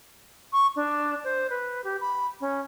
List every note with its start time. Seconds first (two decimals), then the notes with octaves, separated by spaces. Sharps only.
0.53 C#6
0.76 D4
1.24 C5
1.50 B4
1.84 G4
2.01 B5
2.41 C#4